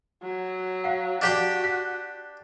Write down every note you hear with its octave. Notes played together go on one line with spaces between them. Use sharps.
F#3
F5 F#5
D4 F#4 G4 G5
F#6 B6